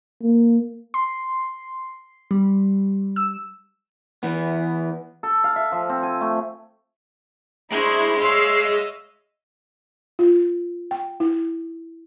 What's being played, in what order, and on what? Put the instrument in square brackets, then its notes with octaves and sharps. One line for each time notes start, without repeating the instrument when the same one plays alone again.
[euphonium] A#3
[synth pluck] C6
G3
E6
[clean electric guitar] E3 B3
[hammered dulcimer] A4
F5
E5
F3
C4
G#5
A3
[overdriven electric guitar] G#3 [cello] D4 C5 [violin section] E4 [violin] C#6 G#6
[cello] C#5 E5 [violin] F5 E6 [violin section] C6 C7
[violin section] D#5
[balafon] F4
G5
E4